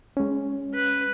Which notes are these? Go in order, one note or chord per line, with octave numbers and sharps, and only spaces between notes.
G#3 C#4
B4